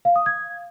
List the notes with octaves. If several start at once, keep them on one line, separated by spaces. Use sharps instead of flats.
F5
D#6
G#6